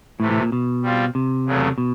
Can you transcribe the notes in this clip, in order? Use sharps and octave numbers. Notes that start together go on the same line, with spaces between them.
A2 C3 E3 A3
A2
A#2
B2
G3 C4 F4
C3
E2 C#3 F#3 A3
B2